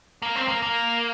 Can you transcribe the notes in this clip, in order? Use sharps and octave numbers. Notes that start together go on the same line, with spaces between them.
A#3
C4
A#3
A#3